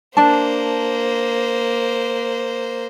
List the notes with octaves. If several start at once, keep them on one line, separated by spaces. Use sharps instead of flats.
A#3 D4 C5 A5